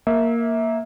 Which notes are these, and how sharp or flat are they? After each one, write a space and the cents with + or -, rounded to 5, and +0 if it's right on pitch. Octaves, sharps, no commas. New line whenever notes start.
A#3 +0 E5 -20